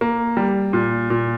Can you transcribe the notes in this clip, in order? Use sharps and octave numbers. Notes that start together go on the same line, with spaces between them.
A#3
G3
A#2
A#2